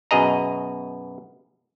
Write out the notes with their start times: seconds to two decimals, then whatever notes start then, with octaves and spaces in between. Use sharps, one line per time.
0.11 F#2 B2 G#4 D#5 A#5